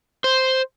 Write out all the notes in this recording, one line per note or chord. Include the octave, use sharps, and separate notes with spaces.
C5